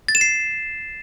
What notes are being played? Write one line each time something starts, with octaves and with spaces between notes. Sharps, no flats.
A6
E7
C7